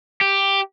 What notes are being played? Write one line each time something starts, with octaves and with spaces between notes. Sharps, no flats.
G4